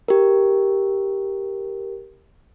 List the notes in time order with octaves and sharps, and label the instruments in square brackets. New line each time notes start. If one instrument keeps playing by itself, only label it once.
[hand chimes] G4 A#4